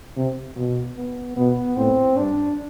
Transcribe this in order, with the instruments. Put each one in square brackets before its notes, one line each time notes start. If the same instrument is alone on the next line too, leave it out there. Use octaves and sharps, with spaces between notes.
[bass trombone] C3
B2
[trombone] B3
[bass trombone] B2 [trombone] B3
[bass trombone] A2 [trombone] C4
[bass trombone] G2 [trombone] D4